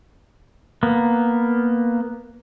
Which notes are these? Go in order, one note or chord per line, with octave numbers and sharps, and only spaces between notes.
A#3 B3